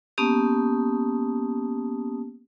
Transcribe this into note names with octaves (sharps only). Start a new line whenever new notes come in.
A#3 B3 C#4 G4 A5 D#6